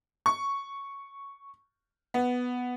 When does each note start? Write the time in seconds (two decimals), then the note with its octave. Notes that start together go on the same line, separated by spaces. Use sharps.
0.26 C#6
2.14 B3